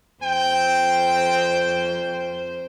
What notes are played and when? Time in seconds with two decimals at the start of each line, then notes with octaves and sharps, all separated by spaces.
0.23 F2 C5 G5